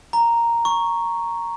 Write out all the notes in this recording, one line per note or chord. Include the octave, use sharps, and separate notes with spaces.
A#5
C#6